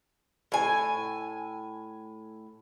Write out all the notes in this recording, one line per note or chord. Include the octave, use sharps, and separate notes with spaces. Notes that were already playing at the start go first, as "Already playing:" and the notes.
A2 G#5